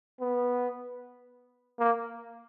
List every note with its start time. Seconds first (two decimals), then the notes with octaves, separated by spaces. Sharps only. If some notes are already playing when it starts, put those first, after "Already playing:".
0.20 B3
1.79 A#3